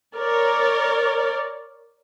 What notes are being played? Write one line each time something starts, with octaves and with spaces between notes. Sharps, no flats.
A#4 C#5 D5